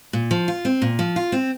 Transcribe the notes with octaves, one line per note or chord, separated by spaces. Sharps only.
A#2
F3
F4
C4
A#2
F3
F4
C4